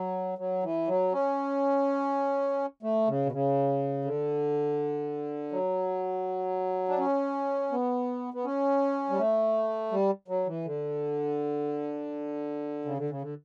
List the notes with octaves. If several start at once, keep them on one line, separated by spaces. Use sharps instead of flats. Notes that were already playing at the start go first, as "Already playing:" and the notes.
Already playing: F#3
F#3
E3
F#3
C#4
A3
C#3
B2
C#3
D3
F#3
D4
C#4
B3
B3
C#4
G3
A3
G3
F#3
E3
D3
C#3
D3
C#3
D3